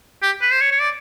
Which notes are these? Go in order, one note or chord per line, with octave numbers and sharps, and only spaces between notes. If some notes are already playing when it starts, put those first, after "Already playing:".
G4
B4
C5
C#5
C#5
D5